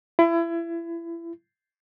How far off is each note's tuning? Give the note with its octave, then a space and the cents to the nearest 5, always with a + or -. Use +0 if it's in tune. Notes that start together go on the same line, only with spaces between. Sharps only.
E4 +30